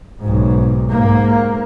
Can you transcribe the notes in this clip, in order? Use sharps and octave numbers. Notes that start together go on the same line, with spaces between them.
B1 G#2
G#2 A#3